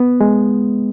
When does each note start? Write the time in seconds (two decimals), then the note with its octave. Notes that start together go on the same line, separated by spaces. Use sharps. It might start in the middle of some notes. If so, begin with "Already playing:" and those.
Already playing: B3
0.21 G#3